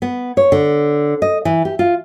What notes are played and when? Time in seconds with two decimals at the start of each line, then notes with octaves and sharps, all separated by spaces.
0.02 B3
0.37 C#5
0.52 D3
1.22 D#5
1.45 E3
1.65 G4
1.79 F4